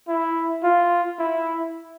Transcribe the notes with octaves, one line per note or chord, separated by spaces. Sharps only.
E4
F4
E4